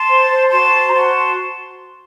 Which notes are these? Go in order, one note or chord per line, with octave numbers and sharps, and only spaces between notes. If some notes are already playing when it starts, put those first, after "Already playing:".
Already playing: A5 C6
C5
C5
F#4 A5 C6
C5
A#5
F#4 A5 C6